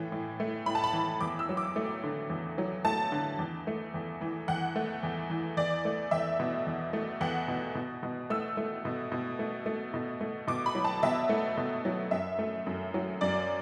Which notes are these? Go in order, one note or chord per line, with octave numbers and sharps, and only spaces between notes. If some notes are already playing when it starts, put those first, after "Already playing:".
Already playing: A2 E3 A3
A2
A3
A2 B5
A5
B5
E3
E2 D6
E6
F#3
D6
A3
D3
E2
F#3
A3 A5
D3
E2
A3
E2
E3
E2 F#5
A3
E2
E3
E2 D5
A3
E2 E5
B2
E2
A3
E2 F#5
B2
B2
B2
A3 E6
A3
B2
B2
A3
A3
B2
A3
B2 D6
B5
F#3
A5
B2 E5
A3
B2
F#3
F#2 E5
A3
F#2
F#3
F#2 D5